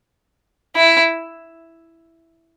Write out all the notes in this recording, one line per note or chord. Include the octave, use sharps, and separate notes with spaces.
E4